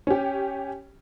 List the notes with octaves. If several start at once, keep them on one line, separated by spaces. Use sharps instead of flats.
C#4 G4